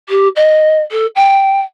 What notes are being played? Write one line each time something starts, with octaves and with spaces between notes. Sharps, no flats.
G4
D#5
A4
G5